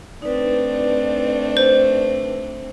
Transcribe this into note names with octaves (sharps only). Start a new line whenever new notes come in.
A3 C4 D4 D#4 B4 D5
C5